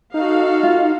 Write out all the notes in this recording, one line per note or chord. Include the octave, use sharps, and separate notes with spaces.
D#4 F#4 A4 F5
F4